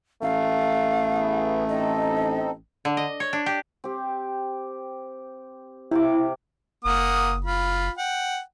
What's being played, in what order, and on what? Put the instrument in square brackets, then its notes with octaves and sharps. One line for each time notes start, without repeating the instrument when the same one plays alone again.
[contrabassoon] A1 [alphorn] A3 [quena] F5
[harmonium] B3 E4 G#4
[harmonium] C4 D#4 A4 [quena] D#5
[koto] D3
D#5
C#5
D4
G4
[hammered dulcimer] C4 G4
[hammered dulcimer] C3 F5 D6 [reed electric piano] E4
[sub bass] F#1 [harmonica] A#3 F#5 D#6
[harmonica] F4 B5
F#5 G5